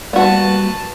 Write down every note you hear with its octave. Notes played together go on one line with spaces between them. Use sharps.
G3 A#3 B3 F#4 B4 A5